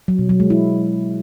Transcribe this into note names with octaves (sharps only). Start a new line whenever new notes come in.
F#3
B2
F#3
G#3
E4